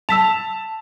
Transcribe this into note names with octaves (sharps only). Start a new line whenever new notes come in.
A5 E6 B6 F7